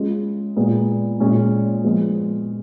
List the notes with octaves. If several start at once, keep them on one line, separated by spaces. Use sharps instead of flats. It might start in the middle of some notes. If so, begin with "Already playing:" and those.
Already playing: G#3 C#4 F4 G#4
A#2 G#3 B3
A#2 G#3 C#4
F3 G#3 B3